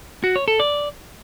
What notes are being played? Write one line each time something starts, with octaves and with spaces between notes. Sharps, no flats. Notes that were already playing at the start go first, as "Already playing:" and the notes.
F#4
C#5
A4
D5